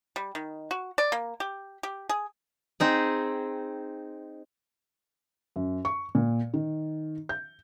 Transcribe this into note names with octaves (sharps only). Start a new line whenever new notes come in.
G3
D#3
F#4
D5
A#3
G4
G4
G#4
C4 D#4 G#4
F#2
C#6
A#2
D#3
G6